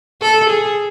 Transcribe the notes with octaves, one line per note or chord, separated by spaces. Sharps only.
A4
G#4